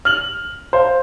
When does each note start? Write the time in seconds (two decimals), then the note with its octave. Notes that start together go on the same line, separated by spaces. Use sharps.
0.05 F6 F#7
0.73 C5 F5